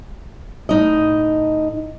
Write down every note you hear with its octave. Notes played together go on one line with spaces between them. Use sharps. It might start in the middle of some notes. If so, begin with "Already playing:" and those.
A2 D#4 D#5